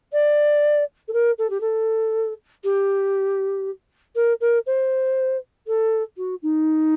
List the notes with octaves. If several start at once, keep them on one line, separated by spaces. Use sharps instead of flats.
D5
A4
A#4
A4
G4
A4
G4
A#4
A#4
C5
A4
F#4
D#4